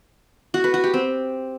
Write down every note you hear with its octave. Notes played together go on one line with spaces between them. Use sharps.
F#4
B4
F#4
G4
C4